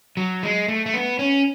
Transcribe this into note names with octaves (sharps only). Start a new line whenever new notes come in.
F#3
G#3
A3
A3
B3
C#4